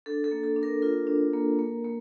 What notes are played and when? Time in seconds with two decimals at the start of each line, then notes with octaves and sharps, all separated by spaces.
0.06 D4 A4
0.24 A4
0.31 A#3
0.43 A4
0.56 D4
0.63 A#4
0.82 F4 A#4
1.07 D4
1.33 A#3
1.59 A#3
1.84 A#3